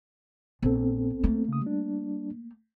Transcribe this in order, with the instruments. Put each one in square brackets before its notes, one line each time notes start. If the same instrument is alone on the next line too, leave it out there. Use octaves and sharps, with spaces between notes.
[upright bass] A#1 [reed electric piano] B3 C4 A4
[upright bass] A3 A#3
[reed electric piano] C#3 D#6
G3 D4